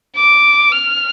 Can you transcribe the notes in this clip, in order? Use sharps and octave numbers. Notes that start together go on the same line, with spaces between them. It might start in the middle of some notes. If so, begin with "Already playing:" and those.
D6
F6